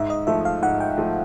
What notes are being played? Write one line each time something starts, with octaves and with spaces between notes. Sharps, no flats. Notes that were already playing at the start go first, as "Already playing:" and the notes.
Already playing: G#2 E5
D#5
F3 A3 E5
F5
G#2 F#5
G5
F3 A3